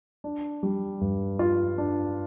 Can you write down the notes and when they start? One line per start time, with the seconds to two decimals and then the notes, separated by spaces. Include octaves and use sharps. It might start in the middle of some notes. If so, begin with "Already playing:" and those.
0.24 D4
0.63 G3
1.01 G2
1.39 F4
1.78 D4